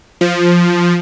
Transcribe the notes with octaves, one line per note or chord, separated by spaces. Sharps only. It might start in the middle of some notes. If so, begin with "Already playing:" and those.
F3